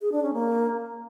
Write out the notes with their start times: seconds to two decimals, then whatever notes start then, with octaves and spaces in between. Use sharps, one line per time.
0.01 G#4
0.12 D4
0.23 C#4
0.33 A#3